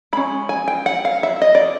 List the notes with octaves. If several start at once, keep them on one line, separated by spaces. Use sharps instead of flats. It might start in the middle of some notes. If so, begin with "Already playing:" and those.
G#3 C#4 B5
G#5
G5
F#5
F5
E5
D#5
D5